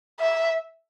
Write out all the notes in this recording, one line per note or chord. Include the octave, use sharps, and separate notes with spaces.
E5